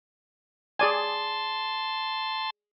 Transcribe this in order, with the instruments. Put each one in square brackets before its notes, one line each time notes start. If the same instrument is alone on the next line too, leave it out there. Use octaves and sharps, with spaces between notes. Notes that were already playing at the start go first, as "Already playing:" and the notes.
[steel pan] G#4 D5 G#5 [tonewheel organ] A5 C6